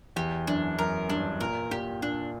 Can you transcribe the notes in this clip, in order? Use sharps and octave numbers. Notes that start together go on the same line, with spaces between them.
E2 G4
F#2 D4
F#2 A#4
G2 D4
A#2 A#4
A#2 G4
A#2 D4